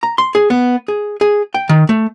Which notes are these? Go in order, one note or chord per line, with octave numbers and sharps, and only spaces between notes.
A#5
C6
G#4
B3
G#4
G#4
G5
D#3
A3